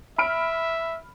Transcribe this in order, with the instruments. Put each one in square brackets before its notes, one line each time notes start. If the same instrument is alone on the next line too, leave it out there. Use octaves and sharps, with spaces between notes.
[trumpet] E5 [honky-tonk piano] B5 F6 D7